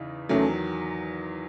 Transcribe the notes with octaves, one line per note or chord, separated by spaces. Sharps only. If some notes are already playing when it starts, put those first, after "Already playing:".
Already playing: E2 C#3 E3 D#4
E2 D#3 F#3 A3 C#4